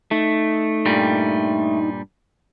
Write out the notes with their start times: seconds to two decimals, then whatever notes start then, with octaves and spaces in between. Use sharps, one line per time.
0.11 A3 D#4
0.86 G2 A#2 G3